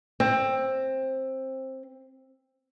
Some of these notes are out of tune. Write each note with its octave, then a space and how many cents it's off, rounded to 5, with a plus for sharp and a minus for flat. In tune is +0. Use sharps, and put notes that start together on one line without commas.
C4 +15